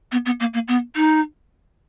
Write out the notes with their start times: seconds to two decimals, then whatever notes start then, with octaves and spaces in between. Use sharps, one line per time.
0.12 B3
0.26 B3
0.40 A#3
0.54 A#3
0.68 B3
0.95 D#4